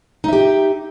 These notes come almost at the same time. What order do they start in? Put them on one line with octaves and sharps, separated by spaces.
D#4 E5 G4